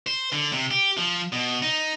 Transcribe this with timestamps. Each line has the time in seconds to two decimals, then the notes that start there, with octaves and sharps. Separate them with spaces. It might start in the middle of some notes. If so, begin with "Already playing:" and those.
0.07 C5
0.32 D3
0.52 C3
0.71 G4
0.97 F3
1.33 B2
1.62 D#4